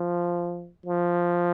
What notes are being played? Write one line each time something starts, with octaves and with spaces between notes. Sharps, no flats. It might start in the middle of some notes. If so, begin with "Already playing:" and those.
Already playing: F3
F3